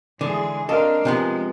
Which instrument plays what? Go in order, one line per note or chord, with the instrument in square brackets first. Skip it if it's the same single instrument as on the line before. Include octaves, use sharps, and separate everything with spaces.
[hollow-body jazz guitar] D3 [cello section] E3 G#3 G#4
[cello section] C4 D4 F5 [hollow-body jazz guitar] A4 [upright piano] A#4 D#5
[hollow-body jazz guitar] C3 F3 B3 [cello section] G#3